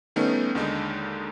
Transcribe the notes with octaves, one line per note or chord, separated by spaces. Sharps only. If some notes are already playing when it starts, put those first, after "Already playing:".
D#3 G3 A3 B3 C#4 D#4
D#2 D3 D#3 G#3 D#4